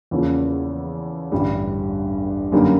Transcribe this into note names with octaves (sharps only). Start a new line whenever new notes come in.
E2 C#3 F3 A#3
A1 G2 D3 G3
F#2 D3 G3 A#3 D#4